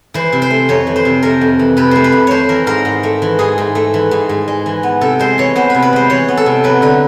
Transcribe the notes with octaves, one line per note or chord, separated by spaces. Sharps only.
E3 C5
C3
C5
A3
F2 C#5
E3
C5
C3
A3 A#4
F2
E3
C3 B4
A3 C5
B4
F2
A3 C5 C#5
E3 A#4
G#2 A#4
G#2
A3
E3
G#2 G#4
G#2
A3
E3
G#2
G#2
G#3
E3
B3
C3 A4
G#3 C5
E3 C#5
B3 C5
C3 B4
B4
G#3 C5
E3 C#5
B3
A4
C3
F#3 B4
D3 B4